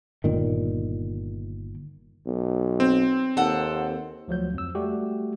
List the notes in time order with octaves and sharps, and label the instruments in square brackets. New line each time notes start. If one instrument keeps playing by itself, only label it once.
[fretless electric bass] G1 A#2 D#3
[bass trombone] B1
[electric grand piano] C4
[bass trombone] D#2 [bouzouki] A4 F#5
[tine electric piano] D2 F3 F#3 G6
F2 E6
G3 A3 F#4 G4